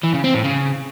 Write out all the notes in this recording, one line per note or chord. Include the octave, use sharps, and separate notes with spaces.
E3
C#3
C4
A2
C#3